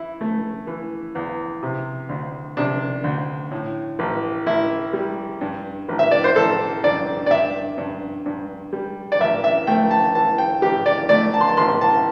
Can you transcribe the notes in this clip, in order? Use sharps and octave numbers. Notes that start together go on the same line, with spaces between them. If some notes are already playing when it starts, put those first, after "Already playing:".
Already playing: E3 E4
A3
E3
E2
C3
D2
C3 D4
D2
A2
A1
A1 E4
G3
G2
A1
E5
D5
C5
A1 A4
G2 D5
D5
G2 E5
G2
G2
G3
D5
A1 E5
E5
A3 G5
A5
E3 A5
G5
A1 G4
D5
A3 D5
A5
C6
A5
A1 C6
A5